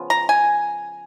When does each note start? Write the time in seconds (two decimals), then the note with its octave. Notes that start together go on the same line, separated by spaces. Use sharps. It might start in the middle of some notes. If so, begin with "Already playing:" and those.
Already playing: C#3 F3 B3
0.10 A#5
0.29 G#5